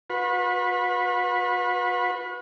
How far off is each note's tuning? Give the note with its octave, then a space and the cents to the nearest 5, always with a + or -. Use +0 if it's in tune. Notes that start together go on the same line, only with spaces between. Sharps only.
F#4 -45 B4 -5